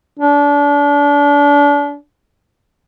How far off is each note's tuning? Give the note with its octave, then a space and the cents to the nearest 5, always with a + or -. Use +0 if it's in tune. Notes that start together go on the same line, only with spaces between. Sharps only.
D4 -30